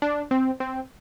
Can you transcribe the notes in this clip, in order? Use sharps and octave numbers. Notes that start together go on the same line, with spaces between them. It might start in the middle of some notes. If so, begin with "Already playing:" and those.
D4
C4
C4